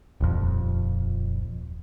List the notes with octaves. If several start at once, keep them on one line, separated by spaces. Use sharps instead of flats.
D#1 F2